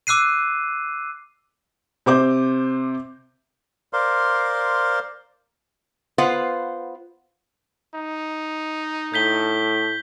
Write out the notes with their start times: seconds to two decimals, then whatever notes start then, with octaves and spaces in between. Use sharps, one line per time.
0.07 D6 E6 F#6 C7 D#7
2.06 C3 C5 D6 G6
3.93 A#4 C5 D5 F5 C6
6.18 B3 F4 B4 C5 F5 F#5
7.94 D#4
9.14 A2 G6 B6 G7